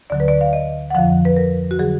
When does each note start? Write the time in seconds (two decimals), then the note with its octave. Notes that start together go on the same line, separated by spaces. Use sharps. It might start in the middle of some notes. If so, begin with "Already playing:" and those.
0.10 D2 D3 F#3 D5
0.20 B4
0.28 D5
0.41 F5
0.53 D#5
0.90 F#5
0.95 F2 D3 F3 F5
1.25 B4
1.36 A#4
1.71 F#4
1.79 D3 F#3 G#4